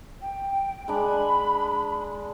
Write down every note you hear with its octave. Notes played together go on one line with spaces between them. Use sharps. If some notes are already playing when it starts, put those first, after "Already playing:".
G5
G#3 D4 B5